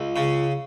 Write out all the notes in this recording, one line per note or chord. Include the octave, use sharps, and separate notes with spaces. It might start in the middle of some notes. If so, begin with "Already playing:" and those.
Already playing: C#2
C#3